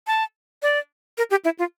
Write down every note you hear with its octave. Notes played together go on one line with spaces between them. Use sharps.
A5
D5
A#4
G4
E4
F4